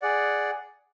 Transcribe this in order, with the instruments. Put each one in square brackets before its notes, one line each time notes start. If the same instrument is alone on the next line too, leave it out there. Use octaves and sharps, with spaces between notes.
[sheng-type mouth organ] G#4 D5 F#5